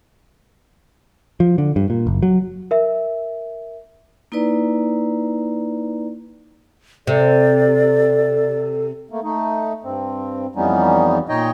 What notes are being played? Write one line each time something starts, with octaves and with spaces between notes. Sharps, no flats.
F3
D3
G2
A#2
F#1
F#3
A#4 E5
A#3 D#4 E4 B4 D5 A#5
C3 A4 D5
A3 A#3
A3 D#4
G2 C4
F2 E3 G3 B3 C#4 D#4
A#2 D#4 C#5 D#5 G5